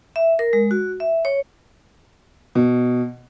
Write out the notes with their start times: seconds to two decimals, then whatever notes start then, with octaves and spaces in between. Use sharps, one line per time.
0.16 E5
0.39 A#4
0.53 G#3
0.71 F#4
1.00 E5
1.25 C#5
2.55 B2